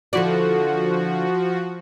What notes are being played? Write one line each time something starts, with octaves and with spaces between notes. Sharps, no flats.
D3 F3 E4 F#4 D5